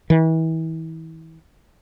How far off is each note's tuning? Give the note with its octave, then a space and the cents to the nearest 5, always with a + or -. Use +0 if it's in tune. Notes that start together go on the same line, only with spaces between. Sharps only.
E3 -35